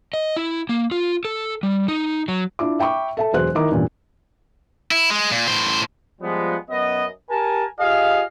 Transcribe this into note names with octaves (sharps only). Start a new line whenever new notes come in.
D#5
E4
A#3
F4
A4
G3
D#4
F#3
D4 E4 F4 D6
E5 G5 B5 C#6 D6
A4 E5 A5
E1 F#3 G#4 C5 F#6
D#3 E4 A#4 D#5 A#5 D6
E2 G2 A#2 C#4
E4
G#3
A#2
A2 C5
F3 G3 G#3 B3
F#2 B3 D#5
G4 A#4 G#5 A5
F4 G4 G#4 D#5 F5